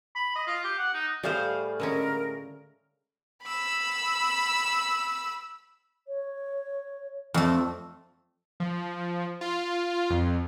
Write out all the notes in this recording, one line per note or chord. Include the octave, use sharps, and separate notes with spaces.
B5
D#5
F4
G4
F#5
D#4
A2 G3 G#4 C5 F5
D3 G#3 C#4 A#4
B5 E6
C#5
F2 A3
F3
F4
F2